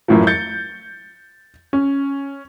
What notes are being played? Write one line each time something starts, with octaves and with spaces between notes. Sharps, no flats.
F#2 A2 E3 F3
G6 A6 C#7
C#4